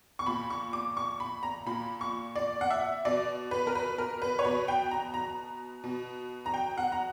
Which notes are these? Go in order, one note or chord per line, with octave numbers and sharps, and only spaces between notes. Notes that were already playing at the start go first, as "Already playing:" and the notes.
C#6
A#2 B5
C#6
D6
C#6
B5
A#5
A#2 B5
C#6
D5
F#5
E5
B2 D5
B4
A#4
B4
A#4
B4
C#5
B2 B4
G5
A#5
A#5
B2
A#5
G5
F#5
A#5